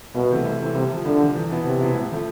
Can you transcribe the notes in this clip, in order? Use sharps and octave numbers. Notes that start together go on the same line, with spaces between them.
C2 B2
C3 E3 A3 C4
C2
C3 E3 A3 C4
C2 C3
C3 F3
C2 D3
C3 F3
E2
B2 B3 E4
E2 C3
B2 B3 E4
A1
A2 F3 A3